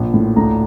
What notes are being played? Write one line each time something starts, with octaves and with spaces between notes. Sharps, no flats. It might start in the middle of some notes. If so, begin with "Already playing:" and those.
Already playing: A#1 A#2
A2
D2 A#5